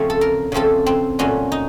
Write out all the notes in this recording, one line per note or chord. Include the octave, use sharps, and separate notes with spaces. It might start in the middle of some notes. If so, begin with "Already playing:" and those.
Already playing: C#3 F3 A3 C4 C#5
A4
A#4
C#3 F3 A3 C4 A4
C4
A#2 F#3 A3 C#4
D#4